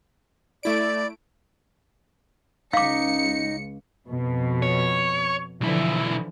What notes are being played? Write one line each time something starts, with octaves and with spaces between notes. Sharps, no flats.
A3 E4 D5 D7
C#2 D#4 F5 D6 C#7
F2 B2
C#5
B1 D3 E3 F3 E4